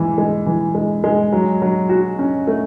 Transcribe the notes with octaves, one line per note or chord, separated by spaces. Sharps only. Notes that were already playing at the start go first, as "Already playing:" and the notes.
Already playing: E3 G#3
G#3
E3
G#3
G#3
F#3
F#3
F#4
C#4
A3